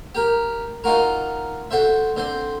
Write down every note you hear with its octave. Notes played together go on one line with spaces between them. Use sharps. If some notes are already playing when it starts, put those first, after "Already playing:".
G4 A#4
D#4 F4 F#4 A#4
F#4 A4 C5 E5
D3 C4 C5